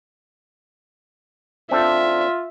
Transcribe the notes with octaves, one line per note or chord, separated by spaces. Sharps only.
C4 D4 F4 A4 E5